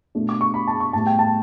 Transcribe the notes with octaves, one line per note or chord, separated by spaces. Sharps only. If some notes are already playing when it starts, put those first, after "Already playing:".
B2 A3 D4
D6
C#6
B5
A5
C#6
A2 G3 B3 A5
G5
A5